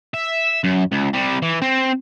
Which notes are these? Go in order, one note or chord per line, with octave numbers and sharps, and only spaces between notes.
E5
F#2
C#2
C3 G3
E3
C4